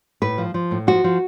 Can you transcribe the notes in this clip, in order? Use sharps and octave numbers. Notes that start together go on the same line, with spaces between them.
A2 B4
F3
F3
A2
F3 F#4
F3